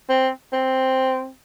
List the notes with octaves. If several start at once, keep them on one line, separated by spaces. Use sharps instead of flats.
C4
C4